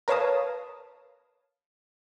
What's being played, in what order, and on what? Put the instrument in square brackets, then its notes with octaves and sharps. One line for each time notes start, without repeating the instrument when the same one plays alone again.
[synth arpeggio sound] A#4 B4 C#5 F5 A5 D#6